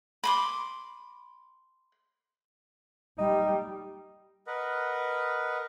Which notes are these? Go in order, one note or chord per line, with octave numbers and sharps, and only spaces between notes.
B5 C6 D6
G3 D#4
A#4 B4 D#5 F#5